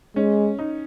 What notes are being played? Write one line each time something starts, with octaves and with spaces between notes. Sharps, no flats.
G#3 C#4
D#4